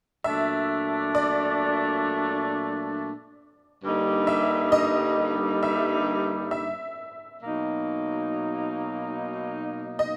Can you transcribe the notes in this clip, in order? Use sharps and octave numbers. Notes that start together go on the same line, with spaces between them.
A#2 F#3 A3 D4 E5
D5
G2 D3 G3 A#3 D#4
E5
D#5
E5
E5
B2 F#3 A#3 D#4
D#5